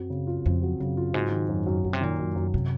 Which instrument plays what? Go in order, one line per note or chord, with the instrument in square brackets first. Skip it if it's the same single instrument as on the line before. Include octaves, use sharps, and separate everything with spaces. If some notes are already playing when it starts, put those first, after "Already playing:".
Already playing: [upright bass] F#2 [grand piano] F#3 C4
[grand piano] C#3
F4
[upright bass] F2 [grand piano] C4
[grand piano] F#3
[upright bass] F#2 [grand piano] C#3
[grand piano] F4
[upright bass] G#2 [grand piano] F#3
[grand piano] D#3
F#2
F#2
[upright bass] A#2 [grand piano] F#3
[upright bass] C3
[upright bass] A#2 [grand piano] D#3
[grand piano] F#2
F#2
[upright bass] C3 [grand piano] F#3